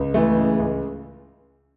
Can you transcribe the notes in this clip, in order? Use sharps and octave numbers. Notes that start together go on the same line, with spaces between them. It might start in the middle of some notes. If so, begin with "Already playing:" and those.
Already playing: C#2
E3 A3
C#3
C#2